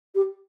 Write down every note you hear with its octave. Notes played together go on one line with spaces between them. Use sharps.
G4